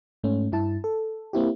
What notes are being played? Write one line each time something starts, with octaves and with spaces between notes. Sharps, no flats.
G#2 A3 C#4
G2 E4 A5
A4
A#3 C4 E4 G4